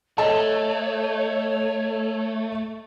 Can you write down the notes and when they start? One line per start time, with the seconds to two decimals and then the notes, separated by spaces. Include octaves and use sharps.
0.18 A3 A4 C#5 D#5 A5